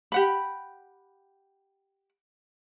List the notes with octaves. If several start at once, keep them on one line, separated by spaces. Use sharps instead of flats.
G4 F#5 B5